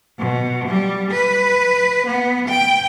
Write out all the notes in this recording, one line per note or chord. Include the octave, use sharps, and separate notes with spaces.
B2
G3
B4
B3
G5